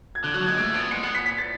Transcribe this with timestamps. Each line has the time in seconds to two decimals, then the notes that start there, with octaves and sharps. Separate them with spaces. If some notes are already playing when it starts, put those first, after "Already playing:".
0.15 G#6
0.24 D3 F#6
0.34 F#3 F#6
0.46 G#3 G#6
0.57 A3 D7
0.74 B3 D7
0.91 G#3 C#7
1.03 B3 C#7
1.15 B6
1.26 B6
1.38 A6